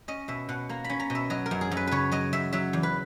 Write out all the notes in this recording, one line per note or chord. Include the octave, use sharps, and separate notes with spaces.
C#4 D#5
B2 E5
B2 F#5
A#3 A#5
B5
C#4
A#5
B2
E5
F#3 D#5
A#4
F#2
G#4
F#2
B4
C#3 B4 C#5
F#3 D#5
F#2 E5
F#3 E5
E2
B4